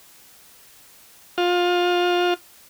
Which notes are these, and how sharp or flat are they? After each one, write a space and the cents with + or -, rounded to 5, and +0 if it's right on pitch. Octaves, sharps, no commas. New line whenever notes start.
F4 +25